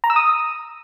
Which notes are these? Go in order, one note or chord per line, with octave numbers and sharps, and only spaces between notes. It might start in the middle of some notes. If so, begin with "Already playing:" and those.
A#5
E6
D#6